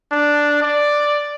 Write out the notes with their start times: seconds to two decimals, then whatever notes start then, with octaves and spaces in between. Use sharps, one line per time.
0.11 D4
0.62 D5